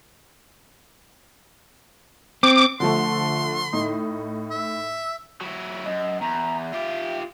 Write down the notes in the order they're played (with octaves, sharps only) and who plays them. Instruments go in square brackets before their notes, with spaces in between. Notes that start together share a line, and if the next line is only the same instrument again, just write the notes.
[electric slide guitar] C4 [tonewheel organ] D6
[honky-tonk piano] D3 F3 A3 [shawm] C6
[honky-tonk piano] A2 D#4
[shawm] E5
[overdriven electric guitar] F#3 E4
[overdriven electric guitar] F#2 [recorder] D#5
[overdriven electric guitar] E2 [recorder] A#5
[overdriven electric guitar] F4 G4 [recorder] E5